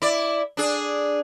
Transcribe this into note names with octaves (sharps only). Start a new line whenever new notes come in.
E4 D5
D4 G#4